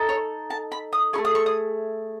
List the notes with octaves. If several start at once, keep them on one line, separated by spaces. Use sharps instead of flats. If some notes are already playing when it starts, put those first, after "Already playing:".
Already playing: D#4 A4
C#5
A5
B5
D#6
A3 E4 G#4 C#6
D#6
C#6
D#6